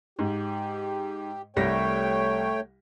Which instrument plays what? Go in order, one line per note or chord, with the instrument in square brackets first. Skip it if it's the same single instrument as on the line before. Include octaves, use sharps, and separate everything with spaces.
[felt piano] G#2 [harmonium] G4
[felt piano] C2 G3 A#6 [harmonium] A3 C#5 G5